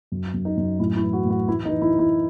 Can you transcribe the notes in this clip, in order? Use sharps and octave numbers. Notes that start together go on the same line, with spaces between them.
F#2
F#2
D#4
F#2
A2 E4
E4
E3
F#4
A2
F#4
E3 E4
D#4
E3
E4
E3
E4